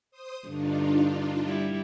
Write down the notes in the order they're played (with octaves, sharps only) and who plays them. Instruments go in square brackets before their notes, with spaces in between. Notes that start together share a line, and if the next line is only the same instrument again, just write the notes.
[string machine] C5 D#6
[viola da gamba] G2 D3 [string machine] D4 D#4 F4
[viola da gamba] G3 E4